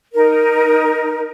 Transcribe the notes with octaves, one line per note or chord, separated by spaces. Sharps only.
D#4 A#4